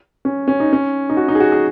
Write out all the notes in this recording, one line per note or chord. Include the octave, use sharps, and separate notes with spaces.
C#4
C#4
D#4
C#4
D#4
F#4
D#4
G#4
F#4
G#4